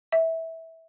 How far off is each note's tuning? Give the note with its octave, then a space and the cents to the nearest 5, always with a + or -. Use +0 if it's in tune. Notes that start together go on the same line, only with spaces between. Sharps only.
E5 -15